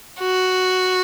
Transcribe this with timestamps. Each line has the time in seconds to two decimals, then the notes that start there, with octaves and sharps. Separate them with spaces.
0.20 F#4